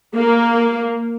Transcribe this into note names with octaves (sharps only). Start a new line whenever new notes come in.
A#3